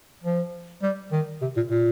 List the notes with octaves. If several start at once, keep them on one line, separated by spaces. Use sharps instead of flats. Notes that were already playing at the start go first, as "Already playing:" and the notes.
F3
G3
D#3
C3
A#2
A#2